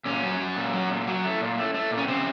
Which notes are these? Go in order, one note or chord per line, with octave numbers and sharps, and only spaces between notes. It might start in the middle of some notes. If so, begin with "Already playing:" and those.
A#2 C#4
F#3
F#3
A#2
F#3
A#2
F#3
A3
A#2
A3
A3
A#2
C#4
C#3 C4